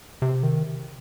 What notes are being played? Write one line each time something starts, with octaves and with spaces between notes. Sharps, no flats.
C3
D#3